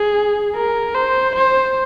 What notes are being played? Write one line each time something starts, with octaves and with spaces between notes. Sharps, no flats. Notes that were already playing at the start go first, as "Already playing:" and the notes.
Already playing: G#4
A#4
C5
C5